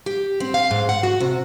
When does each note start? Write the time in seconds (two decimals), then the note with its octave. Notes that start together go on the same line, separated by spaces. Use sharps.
0.06 G4
0.40 C4
0.54 F5
0.71 G#2
0.89 F#5
1.03 F#4
1.20 C3